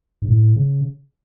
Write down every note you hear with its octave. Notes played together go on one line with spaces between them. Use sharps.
G2
A2
C#3